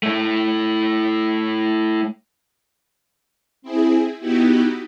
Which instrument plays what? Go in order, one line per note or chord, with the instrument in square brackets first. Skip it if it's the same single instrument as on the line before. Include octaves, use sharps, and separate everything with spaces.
[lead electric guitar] A3 E4
[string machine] C4 E4 G#4
B3 D#4 E4 F#4 G4